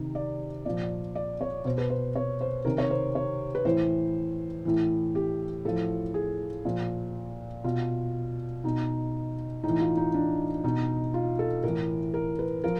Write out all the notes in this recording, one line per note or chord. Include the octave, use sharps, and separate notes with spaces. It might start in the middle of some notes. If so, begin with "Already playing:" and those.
Already playing: C3 D#3
D5
A#2 F3 D5
D5
C#5
B2 C5
B4
C5
C#5
C5
C3 D#3 A#4
C#5
C5
C#5
B4
A2 E3 C5
A2 E3
G4
A2 F3 A4
G#4
A#2 F3
B2 F4
B2 D#4
A2 D#4
E3
F4
D#4
D4
B2 D#4
F4
A4
A2 E3 A#4
A#4
B4
F3 A#4